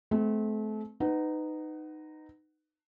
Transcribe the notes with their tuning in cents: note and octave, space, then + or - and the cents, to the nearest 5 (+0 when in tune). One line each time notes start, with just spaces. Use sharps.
A3 -35 C4 -25
D#4 -10 B4 +20 F#5 +15